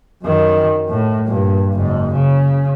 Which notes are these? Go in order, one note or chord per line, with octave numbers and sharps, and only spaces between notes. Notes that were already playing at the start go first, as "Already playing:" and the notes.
F#2 D#3
A2
G2 A#2
F#1 G#2
C#3